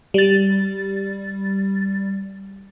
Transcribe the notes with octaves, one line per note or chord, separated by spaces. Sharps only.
G3 A6